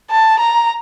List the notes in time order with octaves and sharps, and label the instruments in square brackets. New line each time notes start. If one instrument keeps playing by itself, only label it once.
[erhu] A5
A#5